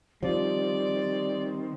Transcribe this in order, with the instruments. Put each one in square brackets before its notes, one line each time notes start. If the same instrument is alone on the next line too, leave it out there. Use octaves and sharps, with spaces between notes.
[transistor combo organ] D#3 C4 [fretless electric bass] F3 [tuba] G3 [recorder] D5